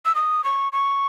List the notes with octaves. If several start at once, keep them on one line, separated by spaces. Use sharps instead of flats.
E6
D#6
C#6
C#6